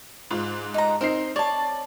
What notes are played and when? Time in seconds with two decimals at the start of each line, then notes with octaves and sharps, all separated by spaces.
0.31 G#2 F4
0.74 D#4 A#5
1.01 C4 D#4 A#4 C7
1.36 C#5 D5 A5